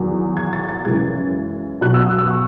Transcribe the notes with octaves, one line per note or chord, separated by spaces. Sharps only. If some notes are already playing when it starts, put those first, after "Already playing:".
Already playing: E2 D#3 F#3
G#6
A6
A6
F#2 C#3 E3 G#3 G#6
B2 F#3 F#6
E6
D#6
E6
C#6